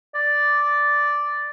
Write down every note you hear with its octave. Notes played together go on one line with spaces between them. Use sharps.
D5